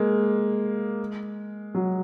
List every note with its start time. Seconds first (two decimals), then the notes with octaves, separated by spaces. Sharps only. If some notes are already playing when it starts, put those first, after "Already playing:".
Already playing: G#3 A#3
1.75 F#3